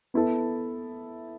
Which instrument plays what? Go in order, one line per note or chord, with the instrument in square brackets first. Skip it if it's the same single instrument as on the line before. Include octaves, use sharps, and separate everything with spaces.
[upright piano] B3 E4 A4